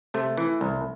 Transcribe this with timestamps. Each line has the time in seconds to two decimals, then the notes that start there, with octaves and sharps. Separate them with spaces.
0.14 C3 A3
0.37 E3
0.61 C2